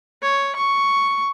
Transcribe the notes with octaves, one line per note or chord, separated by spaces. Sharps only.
C#5
C#6